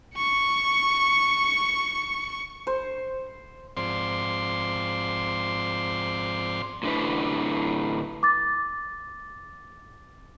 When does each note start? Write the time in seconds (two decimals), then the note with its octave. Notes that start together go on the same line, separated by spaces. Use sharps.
0.18 C#6 C#7
2.67 C5
3.77 G#2 F3 C4 C5 D5 C6
6.83 A2 D3 D4 E4 B4
8.23 D6 A6